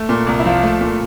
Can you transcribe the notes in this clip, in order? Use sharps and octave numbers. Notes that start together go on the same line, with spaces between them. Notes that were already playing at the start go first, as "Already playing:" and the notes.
Already playing: A3
A#2
C2
E4
F3 F4
A3
A#2